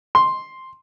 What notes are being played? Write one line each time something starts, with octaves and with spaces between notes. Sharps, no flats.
C6